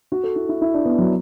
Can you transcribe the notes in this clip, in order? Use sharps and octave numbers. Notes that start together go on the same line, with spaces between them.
F#4
A4
E4
E4
E4
D4
B3
F#3